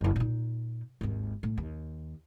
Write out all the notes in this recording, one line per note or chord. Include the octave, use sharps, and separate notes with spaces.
F#1 E4
A#2 D#4
G#1 D#2
A2
D#2